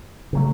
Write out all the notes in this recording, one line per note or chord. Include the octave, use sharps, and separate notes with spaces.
C#3 F#3 A3